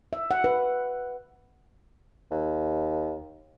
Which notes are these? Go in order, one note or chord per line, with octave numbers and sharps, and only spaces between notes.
E5
F#5
B4
D#2